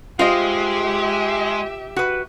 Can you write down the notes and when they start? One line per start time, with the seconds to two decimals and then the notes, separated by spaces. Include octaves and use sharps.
0.19 G#3 F4 G4 C5 D#5 E5
1.96 F#4 B4